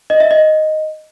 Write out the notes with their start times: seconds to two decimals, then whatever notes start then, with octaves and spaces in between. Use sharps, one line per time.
0.10 D#5
0.20 E5
0.31 D#5